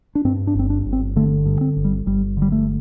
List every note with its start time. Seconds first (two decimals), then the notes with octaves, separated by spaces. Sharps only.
0.15 D4
0.25 G2 C4
0.47 D4
0.55 G1 C4
0.70 D4
0.86 G1
0.93 C4
1.16 D3 A3
1.46 G2
1.61 C4
1.77 G1
1.84 G3
2.06 G1 G3
2.37 D3 G3
2.52 A3